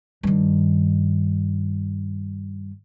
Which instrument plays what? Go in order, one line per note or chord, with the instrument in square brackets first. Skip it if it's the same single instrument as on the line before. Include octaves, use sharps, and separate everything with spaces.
[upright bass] G2 D#3